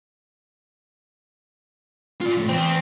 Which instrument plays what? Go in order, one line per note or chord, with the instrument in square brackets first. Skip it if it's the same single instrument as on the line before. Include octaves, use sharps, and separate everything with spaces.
[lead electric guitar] F4 D5
F#2 A2
[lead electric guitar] E2 [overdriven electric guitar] C4